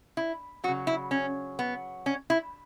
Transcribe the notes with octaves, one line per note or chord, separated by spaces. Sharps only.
E4
C#3 F#3 F#4
E4
C#4
B3
C#4
E4